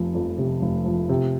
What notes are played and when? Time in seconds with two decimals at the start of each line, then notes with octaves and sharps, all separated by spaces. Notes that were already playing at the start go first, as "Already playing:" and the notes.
Already playing: F1 F3
0.15 F2
0.38 C3
0.62 F1
0.85 F3
1.09 C3